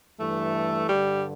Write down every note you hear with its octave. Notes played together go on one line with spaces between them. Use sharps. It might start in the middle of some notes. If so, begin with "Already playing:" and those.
G2 E3 A3
G2 D3 G3